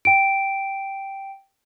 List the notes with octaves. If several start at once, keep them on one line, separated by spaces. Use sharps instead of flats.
G5 D7